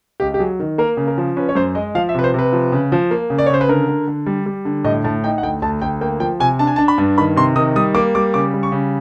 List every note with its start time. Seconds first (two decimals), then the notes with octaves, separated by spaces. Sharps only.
0.20 C#2 G4
0.34 G4
0.39 F#3 G#4
0.60 D#3
0.78 A#3 A#4
0.97 C#3
1.07 A#4
1.18 F3
1.37 C#4 B4
1.49 C#5
1.55 F#2 C5
1.75 G#3 D#5
1.95 F3 F5
2.09 E5
2.14 C3 B4
2.24 C5
2.34 C3 B4
2.53 F3
2.72 C#3
2.92 F3
3.11 A#3
3.30 C#3
3.38 D5
3.46 C#5
3.50 C#3 C5
3.61 B4
3.68 D3 A#4
3.88 D3
4.07 D3
4.26 G3
4.46 G3
4.65 D3
4.85 A2 D#5
5.04 A2 A5
5.24 D#4 G5
5.38 F#5
5.43 D2 G5
5.62 D2 A5
5.82 D2 G5
6.01 A#3 G5
6.20 F3 G5
6.40 C3 G#5
6.59 D4 A5
6.67 G#5
6.76 D4 A5
6.88 B5
6.98 G2
7.18 D#3 B5
7.36 C3 C6
7.56 D#3 D#6
7.76 G3 D#6
7.94 A#3 D6
8.15 G3 D6
8.34 C#3 D6
8.54 G3
8.63 C#6
8.72 C#3